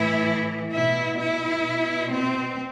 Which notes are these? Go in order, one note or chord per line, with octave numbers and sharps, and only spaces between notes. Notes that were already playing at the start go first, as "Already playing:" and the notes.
Already playing: A2 E3 E4
B2 E4
E4
B2
C4